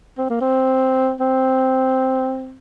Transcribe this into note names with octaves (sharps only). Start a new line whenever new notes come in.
C4
A#3
C4
C4